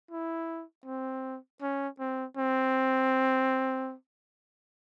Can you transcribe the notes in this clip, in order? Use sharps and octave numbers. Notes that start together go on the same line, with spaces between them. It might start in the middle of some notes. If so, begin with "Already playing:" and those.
E4
C4
C#4
C4
C4